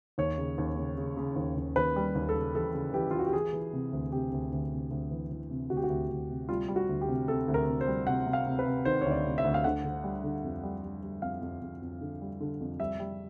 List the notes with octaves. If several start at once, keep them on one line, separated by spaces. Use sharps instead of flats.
D#2 C#5
C#3
D#2
C#3
C#3
C#3
D#2
D#2
D#2 B4
G3
D#2
A4
C#3
E3 A4
C#3
E3 G4
F4
E3 F#4
G4
E3 G#4
E3
C3
D2
C3 G4
D2
D2
C3
D2
E3
E3
C3
D2 F#4
G4
F#4
D2
D2
C3
G3 F4
G3
F#4
D2
G4
C3
C3 A4
D2
A#4
C3
C5
G3
C3 F#5
C3
F5
C3
B4
C3
D#3 C5
D2 C#5
D5
C3
E5
D2
F5
D3 F#5
D3
G3
D3
F2
G3
G3
G3
F2 F5
F2
F2
F2
D3
G3
D3
F2
G3 E5
G3